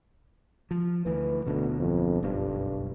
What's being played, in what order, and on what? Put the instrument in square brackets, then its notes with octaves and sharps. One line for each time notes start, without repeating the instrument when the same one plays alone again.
[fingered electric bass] F3
[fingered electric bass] D2 E3 [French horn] B4
[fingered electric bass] D1 B2 D3 [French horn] D2
[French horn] F2
[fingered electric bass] F#1 B1 [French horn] G2